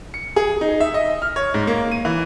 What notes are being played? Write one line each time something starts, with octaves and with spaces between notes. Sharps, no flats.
C#7
G#4
D#4
E5
D#5
F6
C#5
G#2
A#3
D#7
E3